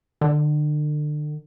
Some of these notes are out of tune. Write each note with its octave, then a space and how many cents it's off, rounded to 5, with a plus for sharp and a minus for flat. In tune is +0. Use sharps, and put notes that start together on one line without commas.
D3 +35